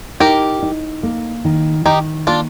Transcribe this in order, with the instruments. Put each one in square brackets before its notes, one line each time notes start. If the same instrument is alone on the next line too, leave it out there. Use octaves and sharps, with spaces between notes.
[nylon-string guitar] D#4 [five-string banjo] G4 A#4
[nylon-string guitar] D#4
A#3
D#3
[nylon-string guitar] D#3 [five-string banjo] D#4 G4
[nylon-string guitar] A#3 [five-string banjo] D4 F4